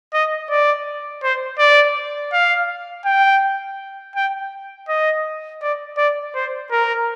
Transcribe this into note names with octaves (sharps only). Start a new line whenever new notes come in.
D#5
D5
C5
D5
F5
G5
G5
D#5
D5
D5
C5
A#4